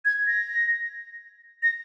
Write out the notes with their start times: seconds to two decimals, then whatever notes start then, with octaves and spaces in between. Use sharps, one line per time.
0.05 G#6
0.27 A#6
1.63 A#6